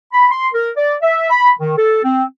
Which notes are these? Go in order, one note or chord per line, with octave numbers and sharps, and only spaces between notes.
B5
C6
A#4
D5
E5
B5
D#3
A4
C4